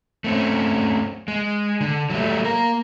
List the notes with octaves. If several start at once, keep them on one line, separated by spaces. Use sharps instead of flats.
A3 C4 C#4
G#3
D3
F#3 G3 A3
A#3 A#4